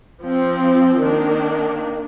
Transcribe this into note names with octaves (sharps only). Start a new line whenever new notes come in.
F3 C4
D#3 A#3 D4